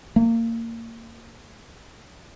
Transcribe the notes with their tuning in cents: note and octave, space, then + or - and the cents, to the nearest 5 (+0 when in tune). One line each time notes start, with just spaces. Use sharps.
A#3 -25